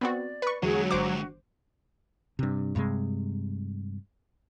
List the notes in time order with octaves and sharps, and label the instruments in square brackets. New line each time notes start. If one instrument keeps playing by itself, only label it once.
[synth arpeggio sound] B3 C4 F#4 [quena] D5
[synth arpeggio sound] B4 C#6
[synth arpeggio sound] E2 [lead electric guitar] D3 G#3 [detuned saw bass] F#3 [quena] G#4
[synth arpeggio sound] G1 C5 D6 [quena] F#4
[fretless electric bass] G2 C3
G2 C3 G#3